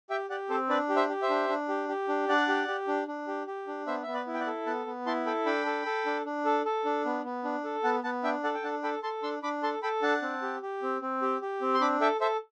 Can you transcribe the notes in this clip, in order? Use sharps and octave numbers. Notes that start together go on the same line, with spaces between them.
G4 E5 G5
G4 D5 F#5
C4 A4 C5
D4 B4 D5
G4
C5 E5
G4
C5 E5
D4
D4
G4
G4
D4
D4 D5 F#5
G4
G4
D4
D4
G4
G4
D4
B3 C5 E5
B3 E5
B4 D5
E4
G5
D5 F#5
A4
B3 F#5 A5
B3
E4 A5 C6
A4 G5 B5
D4 G5 B5
A4
A4
D4
D4
A4
A4
D4
B3
B3
D4
A4
B3 F#5 A5
B3 F#5 A5
D4 E5 G5
A4 D5 F#5
G5
D4 F#5 A5
A4 G5 B5
A4 A5 C6
D4 C6 E6
D4 B5 D6
A4 A5 C6
A4 G5 B5
D4 F#5 A5
C4
G4
G4
C4
C4
G4
G4
C4
C6
D4 B5 D6
A4 E5 G5
A4 C5 E5